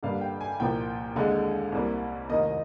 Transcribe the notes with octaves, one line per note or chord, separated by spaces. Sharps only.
G2 D3 G3 A#3 F5
G5
G#5
C2 A#2 F3 A#3 G5
D#2 D3 G#3
C2 C3 G3 A#3
F1 D#2 D#3 A#3 D#5